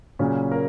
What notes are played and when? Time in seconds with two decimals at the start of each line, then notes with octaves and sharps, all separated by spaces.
0.19 A#2 C#3 F#3 C#4
0.51 A#3 A#4